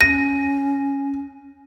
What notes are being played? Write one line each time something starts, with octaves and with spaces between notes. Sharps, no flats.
C#4 A#6 D#7